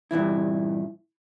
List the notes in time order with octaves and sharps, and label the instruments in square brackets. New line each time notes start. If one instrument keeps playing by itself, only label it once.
[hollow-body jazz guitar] G2 A#2 E3 E4